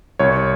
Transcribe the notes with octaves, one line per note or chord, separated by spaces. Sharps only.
C2 C#5